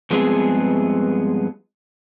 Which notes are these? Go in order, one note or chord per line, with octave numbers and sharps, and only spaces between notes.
G2 F3 G#3 B3 C4 G#4